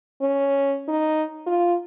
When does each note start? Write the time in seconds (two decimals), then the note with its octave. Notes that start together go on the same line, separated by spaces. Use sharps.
0.21 C#4
0.88 D#4
1.47 F4